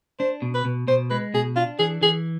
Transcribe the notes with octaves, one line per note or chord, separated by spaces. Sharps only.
D4 C5
B2
B4
B2
B2 C5
G#3 B4
B2 G#4
D4 F4
E3 G#4
E3 G#4